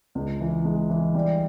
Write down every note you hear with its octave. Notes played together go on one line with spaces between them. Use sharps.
C#2
E3
G#3
E3
G3